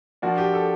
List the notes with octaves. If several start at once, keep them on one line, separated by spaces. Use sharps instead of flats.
F3 A#3 D4 F#4
G4
A4